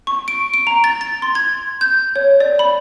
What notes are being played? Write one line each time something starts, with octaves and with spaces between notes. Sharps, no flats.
C#6
D7
D7
A#5
A6
A6
C6
G#6
G6
C#5
D5
B5